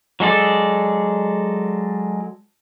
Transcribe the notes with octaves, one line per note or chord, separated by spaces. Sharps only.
F#3 G#3 A4 D5